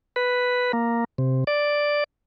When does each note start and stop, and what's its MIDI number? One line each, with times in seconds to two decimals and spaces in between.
0.16 0.72 71
0.73 1.04 58
1.18 1.44 48
1.47 2.04 74